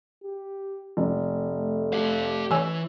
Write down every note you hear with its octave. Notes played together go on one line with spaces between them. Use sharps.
G4
F1
A3
G4 F5
E3 C#5 G#5 E6